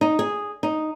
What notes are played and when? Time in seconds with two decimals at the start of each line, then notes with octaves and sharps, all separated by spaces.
0.01 D#4
0.19 G#4
0.63 D#4